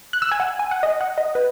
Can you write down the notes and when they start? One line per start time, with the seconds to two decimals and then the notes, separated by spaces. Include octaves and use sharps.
0.13 F#6
0.22 E6
0.31 G#5
0.40 F#5
0.59 G#5
0.71 F#5
0.83 D#5
1.01 F#5
1.18 D#5
1.35 B4